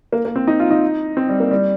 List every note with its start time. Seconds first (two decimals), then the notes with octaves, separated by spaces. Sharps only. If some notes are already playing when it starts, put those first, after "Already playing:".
0.12 A#3
0.25 A#3
0.36 C4
0.47 D#4
0.60 F4
0.71 D#4
1.17 C4
1.29 G3
1.40 A#3
1.51 G3